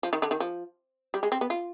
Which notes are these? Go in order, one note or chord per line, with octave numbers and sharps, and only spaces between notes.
F3
D#3
D3
D#3
F3
G3
G#3
C4
B3
F4